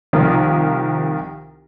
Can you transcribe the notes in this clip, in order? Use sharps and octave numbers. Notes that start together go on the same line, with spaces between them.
C2 D#3 F3 F4 A#4 D#6